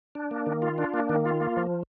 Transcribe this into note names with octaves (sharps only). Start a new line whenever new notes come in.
D4
A#3
D#3
F4
D4
A#3
D#3
F4
A#3
F3